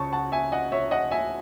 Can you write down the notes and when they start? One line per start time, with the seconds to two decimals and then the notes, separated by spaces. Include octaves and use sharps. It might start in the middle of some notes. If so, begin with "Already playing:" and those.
Already playing: C#2 C#3 A5 C#6
0.13 F#5 A5
0.32 E5 G#5
0.52 D#5 F#5
0.72 C#5 E5
0.91 D#5 F#5
1.11 E5 G#5